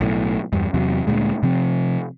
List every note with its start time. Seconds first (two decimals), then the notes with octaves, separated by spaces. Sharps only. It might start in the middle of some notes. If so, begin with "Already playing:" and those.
0.01 B1 A2
0.53 E2 G2
0.74 E2 C3 F#3
1.07 D2 A#2 G#3
1.43 C3 F3 C4